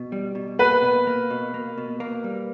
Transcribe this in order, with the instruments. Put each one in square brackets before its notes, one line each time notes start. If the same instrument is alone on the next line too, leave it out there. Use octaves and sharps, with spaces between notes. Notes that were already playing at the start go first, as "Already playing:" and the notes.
Already playing: [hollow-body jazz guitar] B2
G3
B2
[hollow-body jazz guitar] A#3 [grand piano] B4
[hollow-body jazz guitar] B2
A#3
B2
A#3
B2
A#3
G3